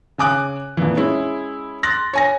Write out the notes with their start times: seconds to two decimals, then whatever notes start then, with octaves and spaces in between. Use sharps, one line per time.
0.18 C#3 G#5 D6 F#6
0.77 F2 A#2 E3
0.97 G#3 C#4 E4
1.83 C6 F#6 A6 A#6
2.13 C#5 G#5 A#6